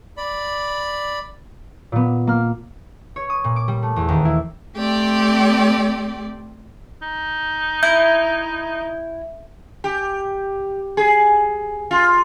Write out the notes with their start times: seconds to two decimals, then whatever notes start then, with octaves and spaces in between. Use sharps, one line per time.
0.17 D5 B5
1.92 A#2 B3
2.27 A#3 F6
3.16 C#5
3.30 D#6
3.44 A#2
3.56 D6
3.68 G3
3.83 A3
3.96 E2
4.08 D#2
4.25 E4
4.76 A3 C4 G4 D5
7.02 D#4
7.83 E4 G6
9.84 G4
10.97 G#4
11.91 F4